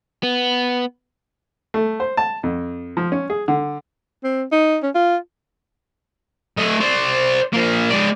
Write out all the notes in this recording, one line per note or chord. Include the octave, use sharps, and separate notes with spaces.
B3
A3
C5
A5
F2
F3
C#4
G#4
D3
C4
D#4
C#4
F4
A3 D#5
C5 D5
F3 A#3
G#3 D5